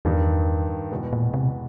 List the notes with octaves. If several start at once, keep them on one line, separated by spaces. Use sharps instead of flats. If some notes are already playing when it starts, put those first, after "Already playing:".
E2 G2 D#3 G3
E2 B2 G#3 B3
A#2
C3